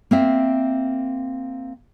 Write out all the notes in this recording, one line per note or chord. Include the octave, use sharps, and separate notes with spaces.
A#3 C4 E5